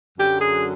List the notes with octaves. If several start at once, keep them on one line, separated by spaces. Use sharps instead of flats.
F#2 D3 F#3 G4
G#4